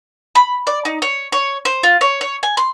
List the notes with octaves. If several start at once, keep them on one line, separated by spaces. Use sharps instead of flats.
B5
D5
D#4
C#5
C#5
C5
F4
C#5
C#5
G#5
C6